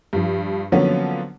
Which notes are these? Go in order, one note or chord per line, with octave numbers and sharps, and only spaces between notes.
G2 F3
D3 F3 F#3 A#3 B3 C#4